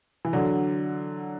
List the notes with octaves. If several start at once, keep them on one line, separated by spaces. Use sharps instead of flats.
E3
D3 F#3